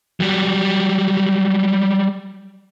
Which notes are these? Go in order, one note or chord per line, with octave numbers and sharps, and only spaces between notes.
F#3 G3